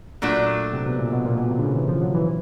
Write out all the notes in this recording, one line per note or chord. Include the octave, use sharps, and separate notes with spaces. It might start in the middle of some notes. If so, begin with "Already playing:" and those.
A#2 F#3 A3 D4
C3
B2
A#2
B2
A#2
B2
C3
D3
C#3
E3
F3
F#3
E3